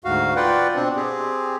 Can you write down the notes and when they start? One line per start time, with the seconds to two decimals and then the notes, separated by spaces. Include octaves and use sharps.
0.04 D2 G#2 F#4 F5
0.36 F4 B4 D5 F#5 G5
0.75 B2 C4 D4
0.96 C4 G4 G#4